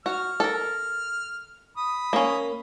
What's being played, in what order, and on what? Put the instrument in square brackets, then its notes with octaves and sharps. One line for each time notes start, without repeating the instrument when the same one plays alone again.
[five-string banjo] F#4 [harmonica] F6
[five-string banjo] A4 A#4
[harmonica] B5 D#6
[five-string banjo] A#3 C#4